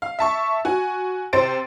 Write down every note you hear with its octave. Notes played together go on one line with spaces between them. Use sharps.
F5
E5 A5 C#6
F#4 G#5
C3 C5 A6 D7